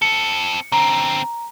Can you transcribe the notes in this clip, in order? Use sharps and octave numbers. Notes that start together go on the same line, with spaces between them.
C4 A4 C#7
D3 C4 A#5